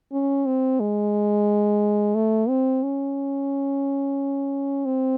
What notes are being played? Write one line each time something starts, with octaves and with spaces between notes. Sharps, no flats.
C#4
C4
G#3
A3
C4
C#4
C4